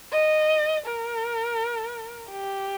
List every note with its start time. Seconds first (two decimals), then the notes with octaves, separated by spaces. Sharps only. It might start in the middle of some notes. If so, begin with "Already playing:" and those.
0.12 D#5
0.86 A#4
2.31 G4